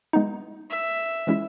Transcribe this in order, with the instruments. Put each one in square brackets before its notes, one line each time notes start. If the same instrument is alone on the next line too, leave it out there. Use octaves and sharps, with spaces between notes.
[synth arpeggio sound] G#3 B3 D#4
[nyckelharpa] E5
[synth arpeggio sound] E3 G#3 C#4 E4